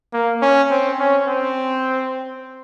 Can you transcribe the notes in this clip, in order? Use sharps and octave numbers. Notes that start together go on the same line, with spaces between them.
A#3
C#4
C4
C#4
C4